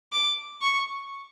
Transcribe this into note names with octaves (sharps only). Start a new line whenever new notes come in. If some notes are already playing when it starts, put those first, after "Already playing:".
D6
C#6